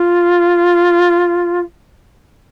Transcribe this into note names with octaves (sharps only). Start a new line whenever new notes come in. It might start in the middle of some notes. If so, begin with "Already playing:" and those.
Already playing: F4